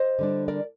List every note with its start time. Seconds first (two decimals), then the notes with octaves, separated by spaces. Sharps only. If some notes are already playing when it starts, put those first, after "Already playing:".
Already playing: C5 D#5
0.19 D3 G3 D4
0.48 A#4 D5